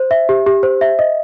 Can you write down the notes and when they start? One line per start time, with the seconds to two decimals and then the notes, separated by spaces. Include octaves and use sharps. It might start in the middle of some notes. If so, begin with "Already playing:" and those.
Already playing: C5
0.11 E5
0.29 G4
0.47 G4
0.63 C5
0.81 E5
0.99 D#5